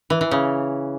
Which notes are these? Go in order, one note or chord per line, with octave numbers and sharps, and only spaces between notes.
E3
E3
C#3